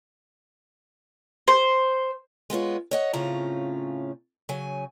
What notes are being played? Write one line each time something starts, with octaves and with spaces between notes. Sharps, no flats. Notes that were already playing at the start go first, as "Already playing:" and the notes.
C5
G#3 B3 F4 C#5
C#5 D#5 F#5
A2 C#3 C4 C#4 F4 A#5
C#3 F#3 G#5